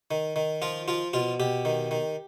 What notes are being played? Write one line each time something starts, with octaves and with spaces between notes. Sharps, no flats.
D#3
D#3
F3 F4
F3 F4
B2 F4
B2 G4
D#3
D#3